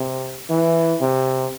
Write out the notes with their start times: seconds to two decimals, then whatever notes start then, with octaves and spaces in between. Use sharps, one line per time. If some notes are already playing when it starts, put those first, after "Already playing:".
Already playing: C3
0.50 E3
1.01 C3